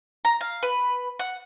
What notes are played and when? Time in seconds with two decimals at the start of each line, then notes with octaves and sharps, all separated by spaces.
0.25 A#5
0.41 F5
0.63 B4
1.20 F#5